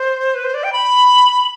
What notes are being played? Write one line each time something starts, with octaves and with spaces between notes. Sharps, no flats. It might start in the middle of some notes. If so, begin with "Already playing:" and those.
Already playing: C5
B4
C5
D5
G5
B5